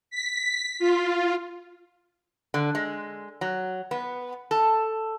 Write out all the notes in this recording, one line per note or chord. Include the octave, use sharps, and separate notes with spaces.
B6
F4
D3
G#3
F#3
B3
A4